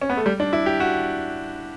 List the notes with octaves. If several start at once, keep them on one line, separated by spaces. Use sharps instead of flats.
C#4
B3
A3
G3
D4
E4
G4
F#4